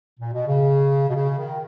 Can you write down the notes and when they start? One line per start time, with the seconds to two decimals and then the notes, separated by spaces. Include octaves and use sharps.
0.20 A#2
0.33 B2
0.47 C#3
1.09 B2
1.15 C#3
1.38 D#3